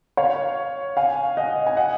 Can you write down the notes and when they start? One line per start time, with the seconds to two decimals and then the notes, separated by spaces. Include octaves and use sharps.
0.17 C#5 F5
0.97 F5 G#5
1.37 D#5 F#5
1.67 G#5
1.77 D#5 F#5